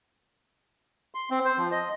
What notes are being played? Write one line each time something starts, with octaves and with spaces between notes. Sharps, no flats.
C6
C4
C5
F3
D#5